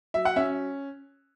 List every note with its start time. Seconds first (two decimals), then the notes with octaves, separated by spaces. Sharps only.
0.14 F#3 E5
0.25 F#5
0.36 C#4 E5